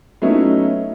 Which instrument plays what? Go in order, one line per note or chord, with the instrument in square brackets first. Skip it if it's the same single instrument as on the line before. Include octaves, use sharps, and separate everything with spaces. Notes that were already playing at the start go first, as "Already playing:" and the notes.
[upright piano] F#3 A3 B3 C#4 D#4 E4